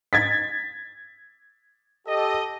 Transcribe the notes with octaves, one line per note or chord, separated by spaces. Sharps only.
G#6 A6 B6
G4 A4 D#5